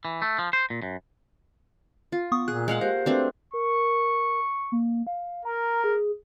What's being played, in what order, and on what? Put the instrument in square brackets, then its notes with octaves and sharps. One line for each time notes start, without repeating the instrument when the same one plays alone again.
[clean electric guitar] E3
A3
F3
C5
A#2
F#2
[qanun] F4
[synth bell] B3 C#6 D#6
[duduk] A#2 [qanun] G#4 [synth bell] F#6
[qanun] G#3 F5 F#5
[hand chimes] A#3 G4 F5 [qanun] A#4 [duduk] C5
[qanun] A3 C4 D4 [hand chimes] F#4 A#4 B4
[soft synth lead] A#4 [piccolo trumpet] C#6
[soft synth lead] A#3
F5
[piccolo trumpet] A#4 [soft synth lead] A#5
[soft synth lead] G#4